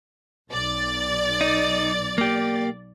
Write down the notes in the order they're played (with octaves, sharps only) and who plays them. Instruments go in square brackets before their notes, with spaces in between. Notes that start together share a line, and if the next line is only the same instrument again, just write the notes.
[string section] B1 D5 A6
[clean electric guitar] D#4
A#3 G4